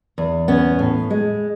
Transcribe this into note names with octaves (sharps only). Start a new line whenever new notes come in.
E2
B3 C#4
A2
G#3